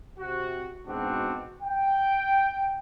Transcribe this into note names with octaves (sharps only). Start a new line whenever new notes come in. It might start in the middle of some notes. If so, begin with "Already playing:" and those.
C3 F#4
G#2 B2 C4 D4 F#4
G5